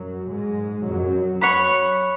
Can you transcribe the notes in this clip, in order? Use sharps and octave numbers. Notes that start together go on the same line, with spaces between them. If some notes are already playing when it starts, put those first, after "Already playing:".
Already playing: F#2 F#3
G#2 G#3
F#2 F#3
C#5 F#5 B5